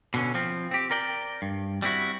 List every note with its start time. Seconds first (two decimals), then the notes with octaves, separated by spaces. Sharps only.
0.14 B2 D3 C#4
0.34 F3 C4
0.71 C4 G4
0.91 A#4 D5 G5
1.42 G2
1.82 G3 C4 E4 F#4